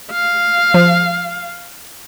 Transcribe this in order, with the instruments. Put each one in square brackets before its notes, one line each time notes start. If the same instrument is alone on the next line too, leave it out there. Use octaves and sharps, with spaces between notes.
[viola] F5
[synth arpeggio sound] F3